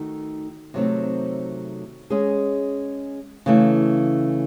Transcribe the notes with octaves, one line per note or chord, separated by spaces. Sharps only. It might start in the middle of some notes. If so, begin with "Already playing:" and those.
Already playing: D#3 A3 D#4 F#4
C3 D#3 F#3 A3 C4
G#3 C#4 G#4 D#5
C#3 E3 A3